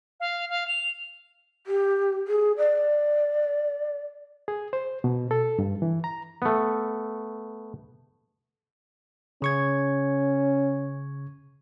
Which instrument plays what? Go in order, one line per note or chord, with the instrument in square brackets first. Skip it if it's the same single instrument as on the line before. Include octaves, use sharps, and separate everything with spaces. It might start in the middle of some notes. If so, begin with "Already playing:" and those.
[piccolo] F5
F5
F7
[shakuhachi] G4
G#4
D5
[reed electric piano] G#4
C5
B2
A4
G2
E3
A#5
[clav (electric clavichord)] A3 B3
[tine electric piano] C#3 C#6 G#6 [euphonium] C#4